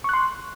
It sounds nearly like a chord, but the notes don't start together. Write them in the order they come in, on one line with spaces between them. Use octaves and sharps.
C#6 F#6 C6